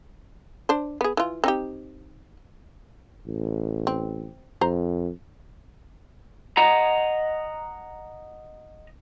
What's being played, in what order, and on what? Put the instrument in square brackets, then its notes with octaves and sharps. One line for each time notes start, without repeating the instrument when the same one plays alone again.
[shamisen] D4 C5
B3 G#4
E3 F4
C4 D#4 G4
[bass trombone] A1
[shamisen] C4
[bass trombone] F2 [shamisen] C5 A#5
[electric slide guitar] D#5 F#5 A#5